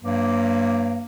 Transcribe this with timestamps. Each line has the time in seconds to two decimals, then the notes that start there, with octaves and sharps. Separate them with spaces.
0.03 G2 F#3 A#3